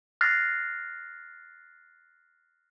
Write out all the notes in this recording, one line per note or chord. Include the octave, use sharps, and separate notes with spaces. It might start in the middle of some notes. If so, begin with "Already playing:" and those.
F6 F#6 A6 A#6 C7